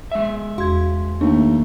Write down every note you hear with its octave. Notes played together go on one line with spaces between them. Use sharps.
G#3 E5
E2 F#4 F5 C6 G#6
D#2 A3 D4